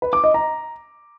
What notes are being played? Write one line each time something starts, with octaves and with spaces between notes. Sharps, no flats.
B4
D6
D#5
A#5